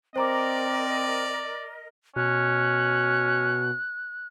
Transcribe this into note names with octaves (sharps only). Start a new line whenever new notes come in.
C4 A#4 C5 D5 D#5 A#5 D6
B2 C#4 F#6